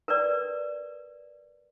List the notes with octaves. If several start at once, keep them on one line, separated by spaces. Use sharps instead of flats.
A#4 B4 D5